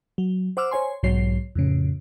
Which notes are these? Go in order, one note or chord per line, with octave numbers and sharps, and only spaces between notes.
F#3
C5 F#5 D6 E6 F6
C5 C#5 G#5 C6
B1 G#2 F#3 C#5 C7
F2 A2 C#3